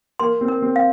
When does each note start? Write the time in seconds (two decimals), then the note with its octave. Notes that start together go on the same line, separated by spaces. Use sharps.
0.19 A#3 C6
0.41 C4
0.48 A#4
0.62 C4
0.76 F5